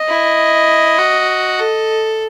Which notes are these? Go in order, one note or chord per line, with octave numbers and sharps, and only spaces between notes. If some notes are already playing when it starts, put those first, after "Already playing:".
Already playing: D#5
E4
F#4
A4